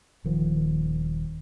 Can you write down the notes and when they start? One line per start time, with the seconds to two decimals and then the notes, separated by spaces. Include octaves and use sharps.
0.24 D#1 D#3 F3